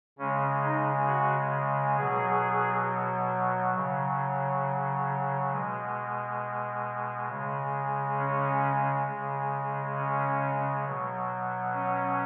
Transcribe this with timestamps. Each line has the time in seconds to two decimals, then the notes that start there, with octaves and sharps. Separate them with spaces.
0.18 C#3 G#3 C#4
0.63 D#4
1.07 F#4
1.96 B2 F#3 G#4
3.74 C#3 F#3
5.51 B2 G#3
7.29 C#3 G#3
8.19 C#4
9.07 C#3 G#3
9.97 C#4
10.86 B2 F#3
11.74 C#4